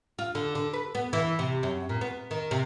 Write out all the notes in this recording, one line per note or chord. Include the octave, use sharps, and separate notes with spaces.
F4
D3
D3
B4
B3
E3
C3
F#2
A#2
B3
D#3
C3